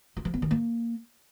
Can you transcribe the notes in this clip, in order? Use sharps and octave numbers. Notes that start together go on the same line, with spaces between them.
F4
F3
B3
D#3
A#3